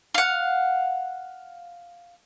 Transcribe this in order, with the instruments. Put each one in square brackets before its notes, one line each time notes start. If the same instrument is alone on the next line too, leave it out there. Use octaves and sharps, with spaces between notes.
[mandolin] F5 F#5